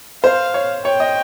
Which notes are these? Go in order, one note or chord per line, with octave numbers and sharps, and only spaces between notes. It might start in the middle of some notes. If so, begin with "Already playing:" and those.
C5 F5
C#5
C#5 G5
D#5